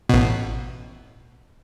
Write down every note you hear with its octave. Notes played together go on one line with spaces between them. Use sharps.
A1 B2